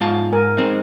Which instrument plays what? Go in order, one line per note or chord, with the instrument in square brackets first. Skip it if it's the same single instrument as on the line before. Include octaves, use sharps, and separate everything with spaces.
[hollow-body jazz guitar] G#2 F4 A5
[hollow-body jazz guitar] G#2 [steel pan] A#4 G#5
[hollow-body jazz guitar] G#3 C4 D#4